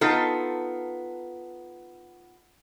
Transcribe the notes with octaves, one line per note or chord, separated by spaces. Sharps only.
B3 D#4 F4 A4